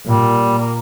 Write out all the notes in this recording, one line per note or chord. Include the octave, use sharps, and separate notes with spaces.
A#2 G3
A#3